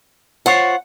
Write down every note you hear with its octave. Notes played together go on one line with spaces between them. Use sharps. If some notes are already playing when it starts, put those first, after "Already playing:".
F4 C5 C#5 F#5